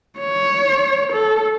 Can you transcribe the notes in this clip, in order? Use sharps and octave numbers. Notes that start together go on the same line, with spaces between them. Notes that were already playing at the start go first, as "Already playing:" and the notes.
C#5
A4